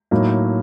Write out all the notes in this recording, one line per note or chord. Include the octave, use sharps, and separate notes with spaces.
A2 F#3 A#3 D#4